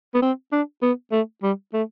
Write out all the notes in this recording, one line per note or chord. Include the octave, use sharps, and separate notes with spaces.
B3
C4
D4
B3
A3
G3
A3